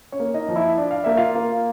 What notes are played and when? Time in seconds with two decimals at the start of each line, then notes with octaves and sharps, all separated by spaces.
0.12 C#4 C#5
0.20 A#3
0.34 D#4 D#5
0.49 F3
0.56 E4 E5
0.78 D4
0.91 F5
1.04 A#3 E5
1.17 F4 F5
1.35 A#3